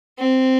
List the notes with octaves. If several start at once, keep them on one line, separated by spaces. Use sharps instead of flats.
C4